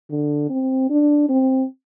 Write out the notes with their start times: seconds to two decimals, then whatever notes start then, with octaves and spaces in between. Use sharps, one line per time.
0.10 D3
0.50 C4
0.90 D4
1.29 C4